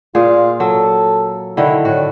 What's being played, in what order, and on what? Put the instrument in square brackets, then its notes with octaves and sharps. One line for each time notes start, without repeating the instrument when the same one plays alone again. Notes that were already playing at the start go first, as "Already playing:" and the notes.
[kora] A#2 G#4 [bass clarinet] F4
[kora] F#3 [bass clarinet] A4
[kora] D3 D#3 [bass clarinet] E4
[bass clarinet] A2 [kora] F#4